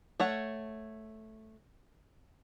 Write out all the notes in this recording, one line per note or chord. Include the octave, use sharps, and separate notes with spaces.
A3 C#5 F#5